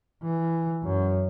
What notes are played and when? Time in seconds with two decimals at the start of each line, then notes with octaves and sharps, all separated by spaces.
0.22 E3
0.84 F#2